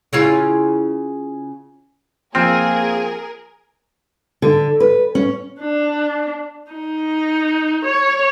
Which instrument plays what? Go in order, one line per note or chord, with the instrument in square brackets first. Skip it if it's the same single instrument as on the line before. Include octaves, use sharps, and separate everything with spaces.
[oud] C#3 E4 F4
[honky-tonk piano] F3 F6 [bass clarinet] A#3 [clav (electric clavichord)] C4 [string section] G#4 A#4
[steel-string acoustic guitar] D3
B4
C#4
[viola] D4
D#4
C#5